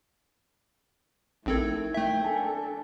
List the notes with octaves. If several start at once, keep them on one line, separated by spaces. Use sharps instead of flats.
A#1 A3 C4 D#4 E4 A4 A#4 G#6
A3 E5 G5
D4 A4 G#5 A5